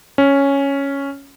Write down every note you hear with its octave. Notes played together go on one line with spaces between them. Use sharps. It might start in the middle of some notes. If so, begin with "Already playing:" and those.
C#4